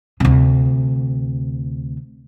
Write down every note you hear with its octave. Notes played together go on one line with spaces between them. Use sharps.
D2 C3